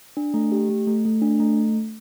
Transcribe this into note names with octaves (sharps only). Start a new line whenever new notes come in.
D4
A3
G4
A3
A3
A3
D4
A3